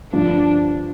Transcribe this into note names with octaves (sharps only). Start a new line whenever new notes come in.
G2 D3 F3 D4